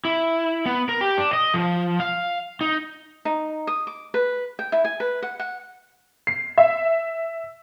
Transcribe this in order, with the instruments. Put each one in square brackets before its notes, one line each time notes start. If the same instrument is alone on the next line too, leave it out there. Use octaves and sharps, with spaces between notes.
[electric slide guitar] E4
B3
A#4
G4
D4
D#5
F3
F5
D#4
[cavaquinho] D#4
D#6
D6
B4
G5
E4
G#5
B4
F#5
F#5
[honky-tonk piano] C7
E5